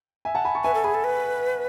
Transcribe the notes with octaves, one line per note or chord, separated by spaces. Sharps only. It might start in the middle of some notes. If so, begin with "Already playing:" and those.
E5 G#5
F#5 A5
G#5 B5
A5 C#6
B4 E5 G#5
A4
G#4 G#5 B5
A4
B4